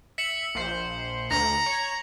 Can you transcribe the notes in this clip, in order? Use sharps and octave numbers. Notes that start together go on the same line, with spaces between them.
E5 B6 C#7 F#7
A#1 C5
D2 A#5 A#6 F7
C#5